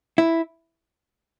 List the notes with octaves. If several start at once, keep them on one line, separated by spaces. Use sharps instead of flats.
E4